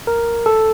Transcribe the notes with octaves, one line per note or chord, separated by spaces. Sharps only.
A#4
A4